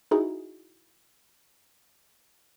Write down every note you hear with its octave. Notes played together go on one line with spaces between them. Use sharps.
D#4 E4 F#4 G#4